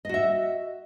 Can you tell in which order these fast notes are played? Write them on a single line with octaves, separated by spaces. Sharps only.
D#5 F#4 E5